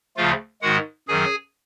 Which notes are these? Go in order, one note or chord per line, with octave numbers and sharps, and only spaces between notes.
D2 C#3 F3 A3 F4 F5
G#2 D#3 G#3 F#4 F#5
F#2 D#3 F#3 G#4 G#5